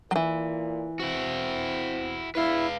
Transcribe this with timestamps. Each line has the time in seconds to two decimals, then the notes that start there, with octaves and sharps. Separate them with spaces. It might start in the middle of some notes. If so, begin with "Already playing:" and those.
0.11 A#2 E3 F#3
1.00 C4 E4 F#4
2.35 E2 E4 B4 F5